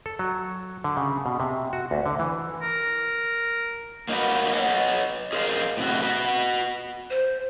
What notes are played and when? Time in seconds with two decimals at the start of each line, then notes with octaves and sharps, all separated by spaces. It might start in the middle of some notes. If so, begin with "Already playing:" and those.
0.06 A4
0.19 F#3
0.84 D3
0.97 C#3
1.26 B2
1.40 C3
1.73 F#4
1.91 D2
2.06 D3
2.19 E3
2.62 A#4
4.09 A#3 D#4 E4 F#4 B4
4.54 B4 C#5 D#5 F#5
5.33 G#4 A#4 C5 D5 D#5 F5
5.77 A2 C3 F#4
6.02 F#4 B4
7.10 C5